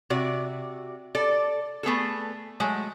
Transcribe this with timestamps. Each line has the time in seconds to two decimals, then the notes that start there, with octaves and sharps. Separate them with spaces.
0.10 C3 F#4 D5
1.15 A4 D5
1.83 A3 B3 G#4 A4
2.60 F#3 G#3 A3